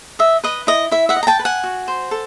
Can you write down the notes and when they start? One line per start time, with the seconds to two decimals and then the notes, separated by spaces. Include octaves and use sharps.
0.19 D#5 E5
0.44 B4 D#5
0.67 E4 D#5
0.91 E4 E5
1.09 E5 F#5
1.16 D#5
1.23 A#5
1.27 G5 A5
1.39 B4
1.45 F#5 G#5
1.64 F#4
1.88 C5
2.11 A4